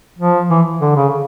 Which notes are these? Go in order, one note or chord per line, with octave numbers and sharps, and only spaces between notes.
F3
E3
D3
C#3